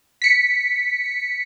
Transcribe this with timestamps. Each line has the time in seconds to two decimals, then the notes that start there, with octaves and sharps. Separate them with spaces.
0.22 B6 C#7